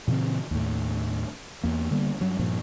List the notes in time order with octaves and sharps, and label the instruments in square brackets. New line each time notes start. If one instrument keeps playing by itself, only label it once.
[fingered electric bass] A#2 C#3 E3 C4
D#2 A2
E2 A#3
D3 G3 A#3 B3
G2 F#3
G2 A#2 F3